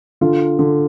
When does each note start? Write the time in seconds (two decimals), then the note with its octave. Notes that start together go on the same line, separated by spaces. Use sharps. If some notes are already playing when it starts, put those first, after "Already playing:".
0.21 D3 F4
0.59 D3